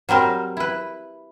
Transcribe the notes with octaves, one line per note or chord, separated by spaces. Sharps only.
F#3 G3 C4 A#4
E4 B4